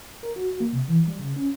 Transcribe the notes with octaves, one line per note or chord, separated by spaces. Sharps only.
A#4
F#4
A#3
C3
E3
G3
C#3
C#4